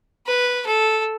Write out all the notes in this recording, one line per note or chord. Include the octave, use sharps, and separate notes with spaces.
B4
A4